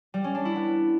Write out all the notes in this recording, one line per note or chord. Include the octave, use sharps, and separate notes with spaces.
G3
C#4
D4
E4
B3